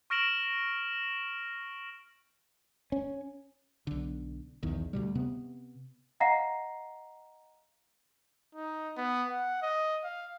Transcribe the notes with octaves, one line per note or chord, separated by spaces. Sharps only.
C#6 F6 A#6 D7 E7 F#7
C#4
B1 D3
B1 E2 D#3
D2 B2 G3
C3 B3
D#5 F5 F#5 A#5 A#6 C7
D#4
B3
F#5
D#5
F5